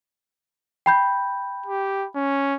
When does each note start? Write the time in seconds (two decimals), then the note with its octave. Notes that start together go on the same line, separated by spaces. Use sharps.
0.86 G5 B5 G6
1.66 G4
2.16 C#4